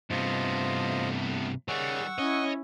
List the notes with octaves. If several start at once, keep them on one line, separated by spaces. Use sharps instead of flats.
G2 C3 A3 B3 F4 C5 D#5
D#3 G3 G#4 C#5 F#5 C#6 E6
C#4 E4 C#5 D#5